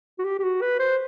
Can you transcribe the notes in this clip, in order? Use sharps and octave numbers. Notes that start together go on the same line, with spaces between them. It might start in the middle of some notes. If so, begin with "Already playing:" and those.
F#4
G4
G4
F#4
B4
C5